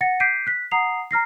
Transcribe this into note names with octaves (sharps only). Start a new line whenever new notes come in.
F#5 A6 A#6 C#7
D6 G6 B6 C7 D7 D#7
F#6 B6
F#5 A#5 D#6 C7 F7
A#5 F6 A#6 C7